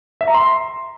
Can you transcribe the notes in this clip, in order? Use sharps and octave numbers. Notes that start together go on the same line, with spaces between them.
E5
A#5
C6